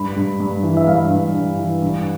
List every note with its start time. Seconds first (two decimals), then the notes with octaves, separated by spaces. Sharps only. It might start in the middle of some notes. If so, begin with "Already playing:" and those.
Already playing: G2 B5
0.16 G2
0.40 G2
0.63 E3
0.77 E5
0.87 G2 F5
1.10 G2
1.34 G2
1.58 E3
1.82 G2